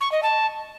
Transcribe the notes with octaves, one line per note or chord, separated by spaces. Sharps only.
C#6
D#5
A5